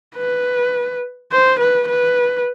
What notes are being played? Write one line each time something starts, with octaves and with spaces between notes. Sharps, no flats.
B4
C5
B4
B4